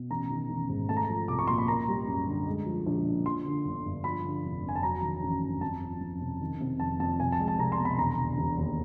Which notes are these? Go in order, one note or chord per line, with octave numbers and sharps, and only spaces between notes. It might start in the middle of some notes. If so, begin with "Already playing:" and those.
Already playing: B2
A1 A#5
D#3
A1
G#2
A3 A5
A#5
F3 A5
C2 D6
C#6
A#2 C6
B5
A#3 A#5
G3
F#2
D3
G#3
F3
A#1
A#2
F3 C6
D3
G1
G2
F3 B5
D3
F1
F2
G#5
A5
F#3 A#5
D#3
A1
G2
F2 A5
F3
F2
C3
D#3
C3
F1 A5
F2 A5
C2 G#5
A5
G#3
A5
C2 A#5
C6
B2
B5
E1 A#5
D3
E1
D#2